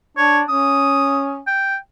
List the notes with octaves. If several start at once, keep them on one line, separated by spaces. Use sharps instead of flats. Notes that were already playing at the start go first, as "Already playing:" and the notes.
D4 C#5
C#4 D#6
G5